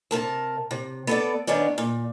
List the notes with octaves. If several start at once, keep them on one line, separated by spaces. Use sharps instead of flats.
C3 A#4 A5
C3
B3 A4 D5
D#3 B3 C#4 D4
A#2